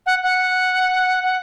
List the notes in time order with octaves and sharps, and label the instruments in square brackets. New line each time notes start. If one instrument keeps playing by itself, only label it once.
[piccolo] F#5
F#5
F#5